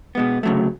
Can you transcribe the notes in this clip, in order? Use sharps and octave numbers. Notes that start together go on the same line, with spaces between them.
B2 G#3 B3
D2 C#3 F#3 A3